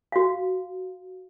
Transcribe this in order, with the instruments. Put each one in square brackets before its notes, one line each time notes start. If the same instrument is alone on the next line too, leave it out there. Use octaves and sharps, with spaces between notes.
[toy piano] F#4 F5